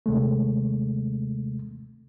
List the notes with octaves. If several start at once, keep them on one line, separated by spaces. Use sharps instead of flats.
D#2 C3 G#3 A3